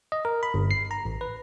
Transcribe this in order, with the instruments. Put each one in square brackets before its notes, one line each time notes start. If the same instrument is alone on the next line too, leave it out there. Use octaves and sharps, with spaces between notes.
[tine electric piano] D#5
A#4
B5
G1
C7
A#5
A1
B4